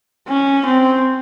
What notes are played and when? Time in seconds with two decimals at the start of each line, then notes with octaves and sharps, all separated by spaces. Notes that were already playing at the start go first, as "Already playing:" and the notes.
0.28 C#4
0.66 C4